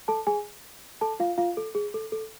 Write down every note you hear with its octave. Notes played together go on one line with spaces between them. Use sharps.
A4 A5
G#4 G#5
A4 A5
F4 F5
F4 F5
A4
G#4
A4
A4